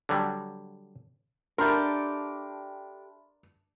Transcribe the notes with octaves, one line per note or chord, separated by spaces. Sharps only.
D3 F#3 G3
D4 G4 A4 A#4 E5 B5 C6